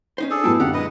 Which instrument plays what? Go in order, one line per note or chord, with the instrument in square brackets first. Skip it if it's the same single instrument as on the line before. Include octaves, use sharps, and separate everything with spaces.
[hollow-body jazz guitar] C#4 D#4 C5
[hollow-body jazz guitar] D4 [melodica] G#4 A4
[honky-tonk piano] A2 F#3 B3 [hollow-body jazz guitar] E4 G5 A5
[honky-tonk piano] F#2 D3 [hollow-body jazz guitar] G4 D5 F5 [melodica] F#5
[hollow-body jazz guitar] A#2 G#3 [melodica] B4 D#5 [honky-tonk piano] D#6